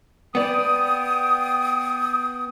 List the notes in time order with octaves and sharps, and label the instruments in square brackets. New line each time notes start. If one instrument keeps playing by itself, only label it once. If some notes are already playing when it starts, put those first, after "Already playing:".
[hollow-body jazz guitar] B3 D5 [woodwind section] G5 D#6